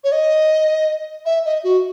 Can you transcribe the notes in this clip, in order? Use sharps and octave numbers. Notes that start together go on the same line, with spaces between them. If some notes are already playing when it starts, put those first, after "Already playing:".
C#5
D#5
E5
D#5
F#4